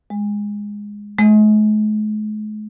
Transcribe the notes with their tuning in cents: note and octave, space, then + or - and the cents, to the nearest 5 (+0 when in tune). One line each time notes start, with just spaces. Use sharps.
G#3 -10
G#3 +45